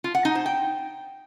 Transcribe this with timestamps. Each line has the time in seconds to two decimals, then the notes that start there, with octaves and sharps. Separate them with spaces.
0.04 F4
0.15 F#5
0.25 D#4
0.35 C5
0.46 G5